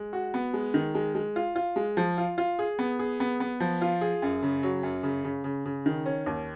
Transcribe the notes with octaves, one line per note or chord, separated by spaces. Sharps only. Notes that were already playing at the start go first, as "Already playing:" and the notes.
Already playing: G#3
F#4
B3
G#3
D#3
G#3
G#3
F4
F4
G#3
F3
F4
F4
G#4
B3
G#4
B3
B3
F3
F4
G#4
F#2
C#3
F#3
F#2
C#3
C#3
C#3
C#3
D#3
C#4
D#2